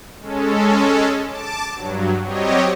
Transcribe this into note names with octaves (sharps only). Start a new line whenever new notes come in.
G#3 C#4 A4
A5 D6
G2 F#3
F#3 G3 C4 G4 C#5 D#5